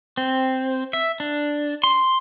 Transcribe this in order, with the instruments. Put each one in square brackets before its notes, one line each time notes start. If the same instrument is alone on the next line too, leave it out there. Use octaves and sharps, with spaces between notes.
[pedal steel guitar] C4
E5
D4
C6